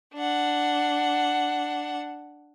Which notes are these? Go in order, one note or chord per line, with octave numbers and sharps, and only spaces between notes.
D4 F#5